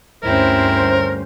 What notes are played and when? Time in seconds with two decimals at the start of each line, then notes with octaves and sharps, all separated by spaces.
0.23 D2 G2 C4 C#4 E4 A#4 C5